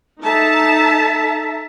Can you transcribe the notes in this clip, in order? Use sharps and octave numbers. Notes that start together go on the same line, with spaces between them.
D#4 A4 E5 A5 A#5